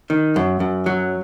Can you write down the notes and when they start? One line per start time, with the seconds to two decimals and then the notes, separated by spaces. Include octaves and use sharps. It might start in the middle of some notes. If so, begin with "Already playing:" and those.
0.10 D#3
0.36 F#2
0.60 F#2
0.86 F#3